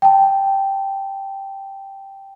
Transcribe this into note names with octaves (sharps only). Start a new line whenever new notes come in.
G5 A5